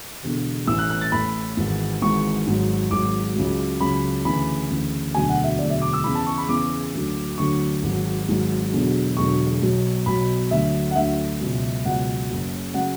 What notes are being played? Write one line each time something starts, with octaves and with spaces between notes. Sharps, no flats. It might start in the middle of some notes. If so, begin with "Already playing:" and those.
E1 E2 D3
A1 A2 E3 E6
F#6
F#6
A6
A1 A2 E3 B5
G#1 G#2 E3
G#1 G#2 E3 C#6
G#1 G#2 F#3
G#1 G#2 F#3 D6
C#2 C#3 F#3
C#2 C#3 F#3 B5
D2 C#3 E3 B5
D2 C#3 E3
E1 D2 D3 F#3 G#5
F#5
E5
E1 D2 D3 F#3 D5
E5
D6
E6
E2 C#3 E3 B5
A5
C#6
B5
E2 C#3 E3 D6
D2 D3 F#3
D2 D3 F#3 C#6
G#1 G#2 F#3
G#1 G#2 F#3
E1 E2 D3 F#3
E1 E2 D3 F#3 C#6
B1 B2 F#3
B1 B2 F#3 B5
D2 D3 F#3 E5
F#5
D2 D3 F#3 E5
C#2 B2 F#3
C#2 B2 F#3 F#5
F#1 F#2 C#3 F#3
C#3 F#3 F#5